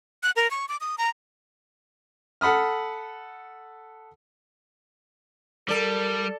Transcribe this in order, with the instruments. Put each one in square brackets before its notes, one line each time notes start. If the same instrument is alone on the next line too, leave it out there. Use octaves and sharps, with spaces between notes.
[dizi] F#6
A#4
C#6
D6
D#6
A#5
[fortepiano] A4 F#5 B5 D#6 F6
[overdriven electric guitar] G3 [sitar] A4 D5 [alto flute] A#4